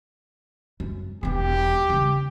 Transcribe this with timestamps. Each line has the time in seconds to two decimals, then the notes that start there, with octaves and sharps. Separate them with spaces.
0.80 F#2
1.23 E1 B3 G4
1.90 C#3 G3